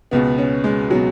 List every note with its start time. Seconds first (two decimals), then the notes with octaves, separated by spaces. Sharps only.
0.11 C#2 B2 B3
0.38 C#4
0.64 G#3
0.91 B2 F#3